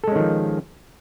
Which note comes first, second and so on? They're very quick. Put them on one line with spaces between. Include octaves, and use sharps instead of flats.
A4 G#3 C#4 D#3 F3